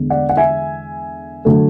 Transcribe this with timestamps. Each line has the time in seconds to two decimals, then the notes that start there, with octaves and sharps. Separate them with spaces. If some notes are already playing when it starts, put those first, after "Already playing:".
Already playing: E2 D3 G#3
0.10 D5 F#5
0.29 F#5
0.37 E5 G#5
1.45 D3 F#3 A3